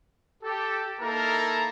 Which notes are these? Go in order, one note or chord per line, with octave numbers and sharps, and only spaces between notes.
G4 A4
A#3 D#4 E4 A4 A#4 A#5